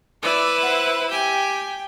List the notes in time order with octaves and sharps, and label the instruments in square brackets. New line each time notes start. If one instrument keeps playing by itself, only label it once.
[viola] E4 B4 [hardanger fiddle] D5
[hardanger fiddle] C5 F#5
[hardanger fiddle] G4 G#5 [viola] G5